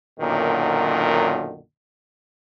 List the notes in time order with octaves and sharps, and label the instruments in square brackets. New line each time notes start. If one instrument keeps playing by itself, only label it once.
[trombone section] B1 F#2 A#2 D3 D#3